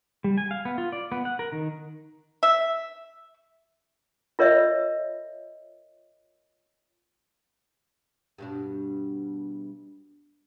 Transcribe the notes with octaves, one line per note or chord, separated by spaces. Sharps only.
G3
G#5
F5
B3
F4
D5
B3
F#5
A#4
D#3
E5
F4 A#4 C#5 D#5 E5
G2 B2 D4